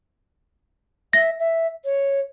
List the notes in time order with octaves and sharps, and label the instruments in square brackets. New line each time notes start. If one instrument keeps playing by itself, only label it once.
[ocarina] E5 [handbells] A#6
[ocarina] E5
C#5